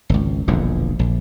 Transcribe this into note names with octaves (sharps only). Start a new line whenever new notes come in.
G#1 C#2
E1 A#1 E2 D3
A#1